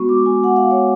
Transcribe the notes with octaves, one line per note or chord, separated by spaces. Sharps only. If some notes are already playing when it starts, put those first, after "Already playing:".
Already playing: G#3 B3 F#4 C#6
D6
G#5
F#5
F5
C#5